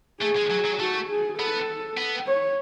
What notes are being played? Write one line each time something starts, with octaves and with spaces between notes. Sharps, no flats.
A3 G#4
G#3
F#3
F#3
A3 F#4
G#4
B3 A4
B3
C#5